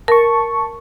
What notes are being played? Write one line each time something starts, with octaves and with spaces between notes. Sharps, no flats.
A#4 A5 C#6